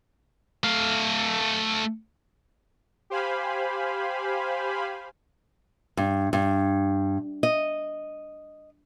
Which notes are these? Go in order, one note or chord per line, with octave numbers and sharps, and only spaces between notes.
A3 F5
G4 C5 F5 G#5 B5
G2
G2
D#5